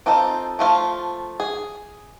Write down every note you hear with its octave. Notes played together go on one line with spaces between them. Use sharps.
C4 D#4 F4 A4 C5
F3 A3 F4
G#4